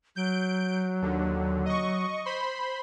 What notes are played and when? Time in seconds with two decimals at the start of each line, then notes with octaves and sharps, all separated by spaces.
0.16 F#3 G6 D7
1.02 D#2 D3
1.66 D#5 C#6
2.25 C5 B5 C6